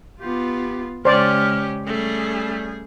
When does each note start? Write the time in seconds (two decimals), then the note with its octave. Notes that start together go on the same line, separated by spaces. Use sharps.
0.20 B3 F4 G4
1.05 C#3 G#3 C#4 G4 C5 D5 F6
1.87 G3 A3 C#4 G#4